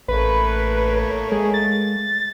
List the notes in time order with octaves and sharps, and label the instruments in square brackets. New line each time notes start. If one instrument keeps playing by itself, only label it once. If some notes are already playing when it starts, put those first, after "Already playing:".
[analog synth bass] A1 [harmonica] A3 A#3 C#5 [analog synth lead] B4
[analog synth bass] G#3 [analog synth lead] G#4
[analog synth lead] A6